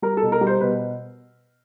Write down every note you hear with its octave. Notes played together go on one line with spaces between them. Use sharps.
G3 A#4
A4
B2
A#4
G3
C5
B2 B4